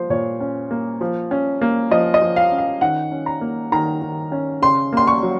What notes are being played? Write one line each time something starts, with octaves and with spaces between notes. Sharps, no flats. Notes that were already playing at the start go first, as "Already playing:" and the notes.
Already playing: F3 A#3 C5
A#2 C#5
C#4
A#3
F3
C#4
A#3
F3 D#5
D#5
F3
F5
C#4
F5
D#3 F#5
C#4
A#5
A#3
D#3 A#5
D#3
C#4
C#3 C6
A#3 C6
C#6
F#3